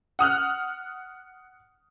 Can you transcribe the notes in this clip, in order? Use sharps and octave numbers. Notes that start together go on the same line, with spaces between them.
F#5 D#6 F6 F#6